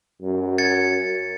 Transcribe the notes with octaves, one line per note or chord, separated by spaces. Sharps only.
F#2
G#6 A6 C#7